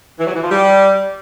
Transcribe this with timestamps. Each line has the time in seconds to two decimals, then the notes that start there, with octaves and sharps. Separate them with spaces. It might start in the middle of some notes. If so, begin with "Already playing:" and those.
0.19 E3
0.27 F#3
0.35 E3
0.43 F3
0.51 G3